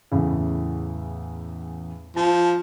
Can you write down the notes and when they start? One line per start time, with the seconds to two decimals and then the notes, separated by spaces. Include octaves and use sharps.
0.11 E2 A2 C#3
2.16 F3 A5